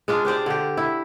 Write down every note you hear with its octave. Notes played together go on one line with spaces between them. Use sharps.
G#3 D4 F4
D4 G4 C5 D5
D3 G4
E4